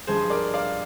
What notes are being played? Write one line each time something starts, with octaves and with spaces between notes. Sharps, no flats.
G2 F3 G#3 G#4 C5
A#4 D5
D5 F5